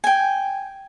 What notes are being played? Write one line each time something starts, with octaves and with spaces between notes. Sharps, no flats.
G5 G#5